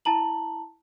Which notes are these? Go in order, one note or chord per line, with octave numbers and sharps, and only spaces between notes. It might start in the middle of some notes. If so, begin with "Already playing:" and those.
E4 A5 A#5 F#7